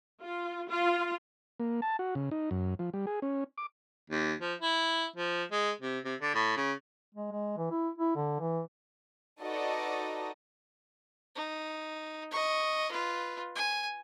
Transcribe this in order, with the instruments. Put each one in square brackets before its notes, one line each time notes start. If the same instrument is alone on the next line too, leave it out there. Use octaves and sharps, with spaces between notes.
[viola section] F4
F4
[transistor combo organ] A#3
A5
F#4
C#3
D#4
F#2
F3
G3
G#4
C#4
D6
[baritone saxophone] D#2
F3
E4
F3
G#3
C3
C3
D3
A2
C#3
[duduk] G#3
G#3
E3
E4
E4
D3
E3
[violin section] D#4 F#4 A4 B4 D5 D#5
[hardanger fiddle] D#4
D#5 C#6
F4 B4
G#5